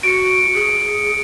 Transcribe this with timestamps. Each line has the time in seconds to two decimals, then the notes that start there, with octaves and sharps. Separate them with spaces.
0.03 F#4 C#7 D7
0.55 G#4